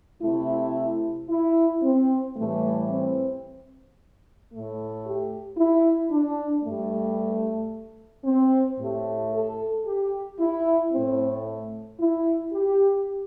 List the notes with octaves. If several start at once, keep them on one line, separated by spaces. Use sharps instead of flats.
C3 A3 E4
E4
C4
A2 E3 G3 A3
C4
A2 A3
G4
E4
D4
G2 G3 A3
C4
A2 A3 G4
A4
G4
E4
A2 A3 C4
E4
G4